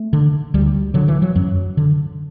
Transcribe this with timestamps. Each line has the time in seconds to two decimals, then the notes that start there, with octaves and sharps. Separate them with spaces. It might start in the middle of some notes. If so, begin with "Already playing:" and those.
Already playing: A3
0.13 D3
0.54 D2 G3
0.94 D3 F#3
1.08 E3
1.22 F#3
1.35 F#2 F#3
1.77 D3